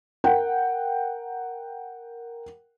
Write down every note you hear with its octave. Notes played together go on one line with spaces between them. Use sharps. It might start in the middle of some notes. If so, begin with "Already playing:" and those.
A#4 F#5 G5